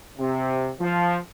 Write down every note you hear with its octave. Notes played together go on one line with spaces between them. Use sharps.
C3
F3